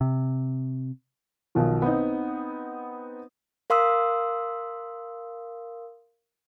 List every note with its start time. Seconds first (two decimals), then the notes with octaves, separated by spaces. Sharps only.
0.01 C3
1.55 B1 B2 D#3 F3
1.82 B3 C4 D#4
3.70 A#4 F5 C6 D#6 E6